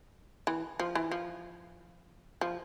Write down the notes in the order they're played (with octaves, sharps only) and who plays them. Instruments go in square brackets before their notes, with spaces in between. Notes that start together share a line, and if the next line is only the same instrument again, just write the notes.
[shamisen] E3
F3
E3
F3
F3